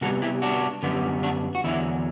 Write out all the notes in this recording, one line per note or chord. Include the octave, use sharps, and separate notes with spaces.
C3 G3 B3 F#4 A4
E4 G4
D4 F#4
F#2 D3 G3 B3
D4 F#4
F#4
E2 D3 F#3 E4